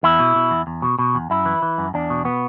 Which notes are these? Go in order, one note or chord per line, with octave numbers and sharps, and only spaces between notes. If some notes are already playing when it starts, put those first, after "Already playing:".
E2 E4
B2
B2
E2
E2
B2
B2
E2
F#2 E4
E3
E3
F#2
E2 D4
B2
B2 B3